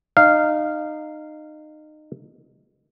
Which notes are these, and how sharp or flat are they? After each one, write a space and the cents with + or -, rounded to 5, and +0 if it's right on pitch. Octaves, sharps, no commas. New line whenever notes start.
D#4 -25 F5 -10